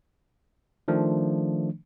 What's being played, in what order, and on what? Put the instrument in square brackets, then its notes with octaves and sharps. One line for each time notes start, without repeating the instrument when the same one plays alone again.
[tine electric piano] D#3 F3 A3 D4